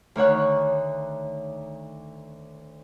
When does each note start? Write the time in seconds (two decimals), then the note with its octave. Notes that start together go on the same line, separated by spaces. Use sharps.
0.16 D2 D#3 C#5 F#5